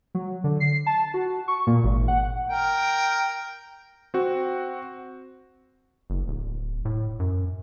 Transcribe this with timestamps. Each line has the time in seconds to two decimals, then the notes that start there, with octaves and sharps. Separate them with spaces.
0.15 F#3
0.44 D3
0.60 C7
0.86 A5
1.14 F#4
1.48 C#6
1.67 A#2
1.84 G#1
2.08 F#5
2.49 A#4 G5
4.14 C4 F#4
6.10 F#1
6.28 D1
6.85 A2
7.20 F#2